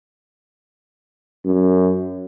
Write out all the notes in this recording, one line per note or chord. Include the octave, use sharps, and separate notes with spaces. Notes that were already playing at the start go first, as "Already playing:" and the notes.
F#2